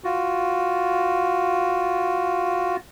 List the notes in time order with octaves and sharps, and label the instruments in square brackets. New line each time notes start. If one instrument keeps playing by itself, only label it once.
[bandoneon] F4 F#4